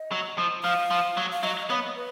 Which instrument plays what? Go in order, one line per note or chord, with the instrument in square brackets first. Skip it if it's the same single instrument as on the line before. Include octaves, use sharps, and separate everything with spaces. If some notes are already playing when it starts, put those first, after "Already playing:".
Already playing: [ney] D#5
[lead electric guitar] F#3
F3
[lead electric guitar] F3 [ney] F5
[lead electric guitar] F3
F#3
[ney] F5
[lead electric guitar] F#3 [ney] D#5
[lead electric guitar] B3 [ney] C#5
[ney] B4